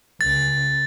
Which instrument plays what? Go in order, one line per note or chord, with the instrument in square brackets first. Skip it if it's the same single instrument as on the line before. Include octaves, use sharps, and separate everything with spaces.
[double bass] C#2 [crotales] A6